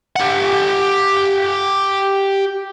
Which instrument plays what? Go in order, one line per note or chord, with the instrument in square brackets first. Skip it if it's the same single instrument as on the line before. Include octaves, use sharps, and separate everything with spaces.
[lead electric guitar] G4 F#5